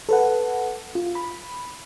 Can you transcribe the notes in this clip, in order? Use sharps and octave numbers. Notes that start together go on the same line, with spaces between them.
A4 B4 F#5
F4
B5